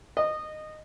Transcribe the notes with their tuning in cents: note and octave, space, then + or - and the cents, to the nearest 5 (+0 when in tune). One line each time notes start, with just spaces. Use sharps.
D#5 -15